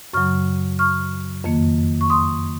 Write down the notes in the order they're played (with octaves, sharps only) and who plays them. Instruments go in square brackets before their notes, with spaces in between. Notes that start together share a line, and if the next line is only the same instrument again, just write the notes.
[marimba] F#2 C#3 F#3 C#6 F6
C#6 F6
F2 D#3 A#3
C#6
C6 D#6